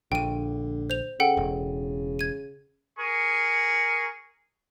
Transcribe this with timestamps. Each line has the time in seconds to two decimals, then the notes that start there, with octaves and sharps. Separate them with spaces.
0.12 A#1 D3 G5 D#7
0.90 C5 F7
1.20 C#3 A4 F#5 G5
1.37 E1
2.19 G#6 D#7
2.99 G#4 A#4 C#6